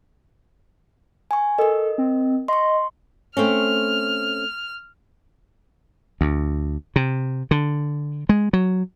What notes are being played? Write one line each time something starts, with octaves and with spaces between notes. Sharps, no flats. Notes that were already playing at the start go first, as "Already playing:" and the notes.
G#5 C#6
A4 A#4 D#5
C4
D#5 C6 C#6
A3 C4 C#4 F6
D2
C3
D3
G#3
F#3